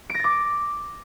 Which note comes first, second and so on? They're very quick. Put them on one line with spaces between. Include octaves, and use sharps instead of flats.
D7 A#6 A6 D6